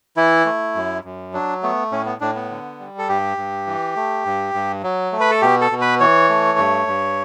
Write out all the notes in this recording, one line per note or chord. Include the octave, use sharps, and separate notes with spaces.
E3 E4
A3
F#2
F#2
F#3 D4
A3 B3
A2 C#4
B3
A2 D4
B3
D3
G3
A4
G2 G4
G2
E3
A3
G2
G2
F#3
A3
B4
A4
B2 G4
A4
B2
B4
E3 C#5
A3
G2
G2